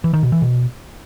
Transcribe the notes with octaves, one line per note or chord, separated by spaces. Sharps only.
E3
D#3
B2
E3
B2